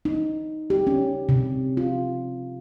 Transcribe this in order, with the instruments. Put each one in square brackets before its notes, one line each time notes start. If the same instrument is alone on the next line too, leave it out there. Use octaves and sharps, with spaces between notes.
[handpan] D#4
G4
C#4
C3
F4